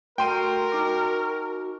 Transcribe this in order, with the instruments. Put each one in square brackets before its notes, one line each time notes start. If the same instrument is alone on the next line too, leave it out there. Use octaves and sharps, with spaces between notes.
[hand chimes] A3 [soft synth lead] F#4 [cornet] A#4 [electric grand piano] G5 C6 D#7
[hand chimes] D#4 D6